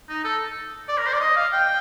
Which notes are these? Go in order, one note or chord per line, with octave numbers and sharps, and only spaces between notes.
D#4
A4
D5
A#4
C5
D5
D#5
F5
G5